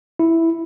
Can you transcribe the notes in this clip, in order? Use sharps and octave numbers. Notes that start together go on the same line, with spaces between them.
E4